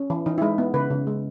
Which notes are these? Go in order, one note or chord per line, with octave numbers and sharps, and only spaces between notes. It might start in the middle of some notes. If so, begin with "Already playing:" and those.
Already playing: C#4
E3
E3 D#4
E4
G#3 D#4
B3
C#3 B4
C#3
G#3